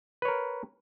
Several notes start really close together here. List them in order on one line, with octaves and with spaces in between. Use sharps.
B4 C#5 A#4